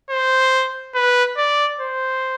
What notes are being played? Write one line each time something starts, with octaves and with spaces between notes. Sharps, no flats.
C5
B4
D5
C5